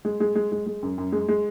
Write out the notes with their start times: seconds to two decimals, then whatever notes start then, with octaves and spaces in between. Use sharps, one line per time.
0.05 G#3
0.20 G#3
0.36 G#3
0.52 G#3
0.67 G#3
0.83 F#2
0.98 F#2
1.12 G#3
1.29 G#3